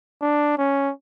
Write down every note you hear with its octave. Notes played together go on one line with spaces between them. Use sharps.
D4
C#4